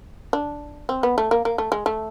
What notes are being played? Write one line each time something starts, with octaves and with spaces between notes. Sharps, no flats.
D4
C4
B3
A3
A#3
A#3
A3
G#3
A3